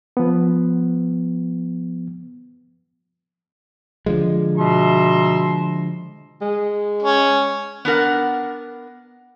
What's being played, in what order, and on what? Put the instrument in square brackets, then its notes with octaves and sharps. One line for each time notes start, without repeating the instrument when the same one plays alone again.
[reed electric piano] F3 B3
[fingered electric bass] D3 F3 G#3
[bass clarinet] B2 [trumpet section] E5 A#5 C6
[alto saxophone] G#3
[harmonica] C#4
[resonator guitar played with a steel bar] B3 D4 A#4 F#5